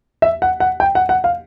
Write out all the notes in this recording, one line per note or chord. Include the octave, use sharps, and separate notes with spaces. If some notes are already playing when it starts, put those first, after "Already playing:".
E5
F#5
F#5
G5
F#5
F#5
F5